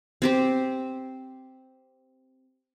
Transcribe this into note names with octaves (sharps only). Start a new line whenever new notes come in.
C4 G4 C5